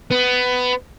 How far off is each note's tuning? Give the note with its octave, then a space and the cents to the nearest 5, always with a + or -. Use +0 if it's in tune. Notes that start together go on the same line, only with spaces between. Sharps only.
B3 +15